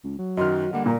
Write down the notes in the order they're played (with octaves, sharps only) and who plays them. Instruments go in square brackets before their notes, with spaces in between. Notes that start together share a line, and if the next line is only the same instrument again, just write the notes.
[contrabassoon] C#2
F#3
[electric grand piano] F#2 D#3 [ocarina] F#4 [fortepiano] D#5 C6 F6
[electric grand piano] D3 G3 A#3 [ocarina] F#5
[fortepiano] A#2 [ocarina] A#4